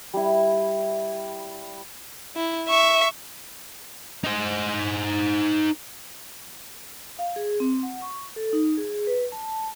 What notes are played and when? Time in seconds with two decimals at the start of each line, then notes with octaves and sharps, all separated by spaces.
0.14 G3 E4
2.36 E4
2.69 E5 C#6
4.24 D#4 C5
7.19 F5
7.36 G#4
7.60 C4
7.83 F#5
8.02 C#6
8.36 A4
8.53 D#4
8.78 G#4
9.07 B4
9.32 A5